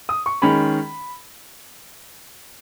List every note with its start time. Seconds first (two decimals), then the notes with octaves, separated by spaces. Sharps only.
0.09 D#6
0.26 C#6
0.42 D#3 G#3 C#4 B5